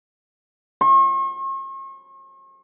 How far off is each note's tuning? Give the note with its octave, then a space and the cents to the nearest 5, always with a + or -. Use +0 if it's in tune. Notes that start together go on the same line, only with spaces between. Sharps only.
C#6 -45